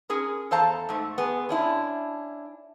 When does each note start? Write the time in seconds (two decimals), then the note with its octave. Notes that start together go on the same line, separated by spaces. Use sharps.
0.09 C#4 G#4 A#4
0.51 E2 A4 C5 F5 A5 A#5
0.89 G#2 A3
1.18 B3 G#4
1.49 C#4 D4 E4